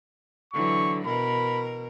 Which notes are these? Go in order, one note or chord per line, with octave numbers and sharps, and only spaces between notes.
D3 E3 F#3 C#6
B2 A#4 B5